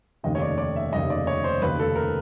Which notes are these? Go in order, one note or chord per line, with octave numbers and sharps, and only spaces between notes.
F1 D#2 C#3 D#5
C#5
D5
D5
E5
F1 D#2 C#3 D#5
D5
C#5
C5
F1 D#2 C#3 B4
A4
A#4